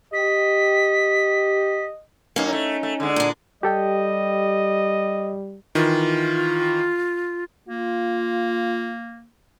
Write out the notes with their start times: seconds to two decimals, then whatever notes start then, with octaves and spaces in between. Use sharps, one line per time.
0.13 G4 D#5 B6
2.36 F#2 A#3 C#4 D#4
2.53 A3
2.83 A3
3.00 D3 G#3
3.16 A#2 D4
3.63 G3 G4 A4 D#5 G5
5.75 D#3 E3 F4
7.69 A#3 F4